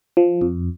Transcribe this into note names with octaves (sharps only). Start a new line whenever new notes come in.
F3
F2